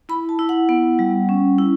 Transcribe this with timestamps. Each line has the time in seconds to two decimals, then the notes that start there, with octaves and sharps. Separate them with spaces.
0.09 E4 B5
0.29 A5
0.39 E4
0.49 F#5
0.69 B3
0.99 G3
1.29 C#4
1.59 E4